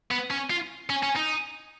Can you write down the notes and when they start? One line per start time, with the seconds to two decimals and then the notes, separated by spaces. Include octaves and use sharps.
0.11 B3
0.30 C#4
0.50 F4
0.90 C#4
1.03 C#4
1.16 D#4